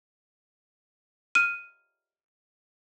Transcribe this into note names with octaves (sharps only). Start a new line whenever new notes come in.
F6 D#7